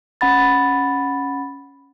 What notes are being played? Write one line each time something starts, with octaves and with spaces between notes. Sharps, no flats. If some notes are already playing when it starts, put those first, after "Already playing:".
C#4 F#5 B5 A6